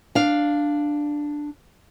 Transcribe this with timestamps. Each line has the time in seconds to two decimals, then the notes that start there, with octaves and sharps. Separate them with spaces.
0.15 D4 F5